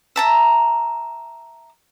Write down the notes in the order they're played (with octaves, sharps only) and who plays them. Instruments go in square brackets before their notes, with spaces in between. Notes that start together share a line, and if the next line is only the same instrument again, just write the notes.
[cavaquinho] E5 A5 A#5